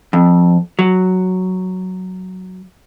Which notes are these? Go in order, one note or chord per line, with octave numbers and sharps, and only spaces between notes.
F2
F#3